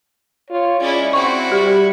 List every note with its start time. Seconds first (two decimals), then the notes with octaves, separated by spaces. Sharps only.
0.50 F4 C#5
0.80 G#3 C#4 E4 D5
1.13 C4 E4 F#4 C#6
1.52 G3 G4